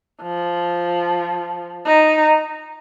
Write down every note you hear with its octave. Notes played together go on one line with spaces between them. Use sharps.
F3
D#4